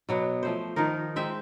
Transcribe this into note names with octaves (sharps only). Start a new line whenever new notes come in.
B2 F#3 B3
F3 A3 C5
D#3 F3 D#4 A#4
G#3 C4 E5 G5